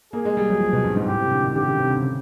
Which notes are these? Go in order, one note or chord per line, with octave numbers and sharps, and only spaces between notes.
A#3 G#4
G#3
G3
F#3
F3
B2
G2
G#2
A2 G4
C3
D3
D#3
D3 G4
C#3
C3
D3
C#3